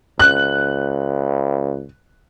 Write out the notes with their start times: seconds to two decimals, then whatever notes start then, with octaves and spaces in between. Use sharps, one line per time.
0.19 C#2 F#6